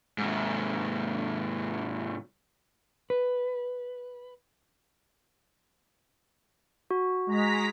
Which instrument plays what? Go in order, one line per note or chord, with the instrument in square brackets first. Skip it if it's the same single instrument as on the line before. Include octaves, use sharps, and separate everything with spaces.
[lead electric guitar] G#2 C3
[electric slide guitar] B4
[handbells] F#4
[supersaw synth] G#3 A#5 B6